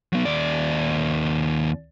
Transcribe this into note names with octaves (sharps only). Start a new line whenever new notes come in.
F#3 B3
D#2 D5